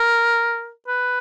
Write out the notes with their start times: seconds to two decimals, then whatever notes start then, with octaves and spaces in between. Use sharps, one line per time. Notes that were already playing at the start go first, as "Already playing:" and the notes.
Already playing: A#4
0.88 B4